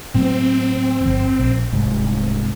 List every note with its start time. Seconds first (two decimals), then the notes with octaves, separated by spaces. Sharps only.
0.14 A2 F#3 B3 C4
1.01 G1 F2
1.39 A#1
1.72 D1 C2 G#2